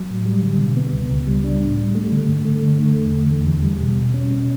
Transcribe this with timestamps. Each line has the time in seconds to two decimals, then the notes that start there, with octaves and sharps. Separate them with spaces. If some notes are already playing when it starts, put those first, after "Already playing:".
Already playing: F#3
0.10 A2
0.26 G3
0.42 D3
0.59 B2
0.77 B3
0.93 C#2
1.11 C#2
1.27 G3
1.44 D4
1.60 A2
1.77 G3
1.95 A3
2.12 D3
2.28 G2
2.45 A3
2.62 D3
2.78 A3
2.96 E2
3.13 D3
3.30 E2
3.47 E2
3.63 G3
3.80 B2
3.96 B2
4.14 C#4
4.31 B2